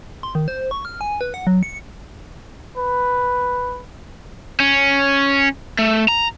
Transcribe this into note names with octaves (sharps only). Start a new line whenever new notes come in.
C6
D#3
C5
C#6
F6
G#5
B4
F#5
F#3
C#7
B4
C#4
A3
A#5